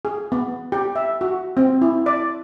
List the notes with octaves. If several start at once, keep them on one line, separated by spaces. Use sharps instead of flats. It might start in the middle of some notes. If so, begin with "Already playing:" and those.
G#4
B3
G4
E5
F#4
C4
E4
D5